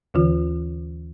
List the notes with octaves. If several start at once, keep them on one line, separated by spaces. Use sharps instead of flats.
D#2 D3 E3 F4